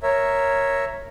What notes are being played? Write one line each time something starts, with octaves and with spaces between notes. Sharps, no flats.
A#4 C#5 E5